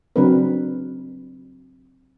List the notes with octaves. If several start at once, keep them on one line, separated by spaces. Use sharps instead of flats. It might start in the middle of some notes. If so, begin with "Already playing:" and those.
C#3 F#3 C4 D4 A#4 B4